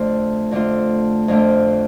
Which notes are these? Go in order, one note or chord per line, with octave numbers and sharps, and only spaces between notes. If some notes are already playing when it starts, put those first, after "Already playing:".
Already playing: F2 D3 A3 F4
F2 D3 A3 F4
F2 D3 A3 F4